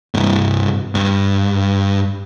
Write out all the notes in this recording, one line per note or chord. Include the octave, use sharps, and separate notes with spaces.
C2 G2
G2